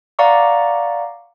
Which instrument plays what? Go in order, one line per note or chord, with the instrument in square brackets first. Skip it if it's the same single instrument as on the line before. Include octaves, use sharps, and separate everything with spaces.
[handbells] D5 F5 F#5 A#5 C#6 D6